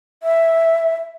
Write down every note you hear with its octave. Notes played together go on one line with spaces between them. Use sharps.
E5